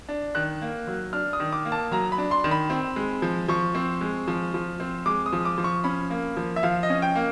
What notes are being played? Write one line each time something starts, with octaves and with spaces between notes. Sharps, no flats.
D4
D#3 F#6
A#3
F#3
D4 F6
D#6
D#3
D6
A#3
A5
F#3 A#5
B5
D4
C6
D#3
B5
C4
G#3
F3
F3 C#6
C4
G#3
F3
F3
C4
G#3 D6
D#6
F3
D6
F3
C#6
C#4 B5
A#3
F3
E5
F3 F5
D#5
C#4
G5
A#3